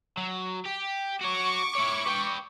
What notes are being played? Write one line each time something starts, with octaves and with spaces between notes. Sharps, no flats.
F#3
G4
F#4 C#5 C#6 D6
E4 C#5
B4 G5